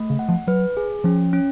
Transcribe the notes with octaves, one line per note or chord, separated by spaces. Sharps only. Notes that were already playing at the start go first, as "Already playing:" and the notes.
Already playing: A3
C#3
F#5
F3
F#3 B4
G#4
F3 C#4
C#4